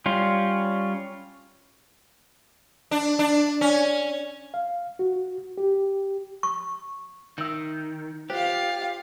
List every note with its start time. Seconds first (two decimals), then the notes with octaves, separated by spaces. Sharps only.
0.06 G3 C#4 F4
2.91 D4
3.19 D4
3.61 C#4
4.54 F5
4.99 F#4
5.58 G4
6.43 C#6
7.38 D#3 E5 E6
8.30 F4 G4 C5 F5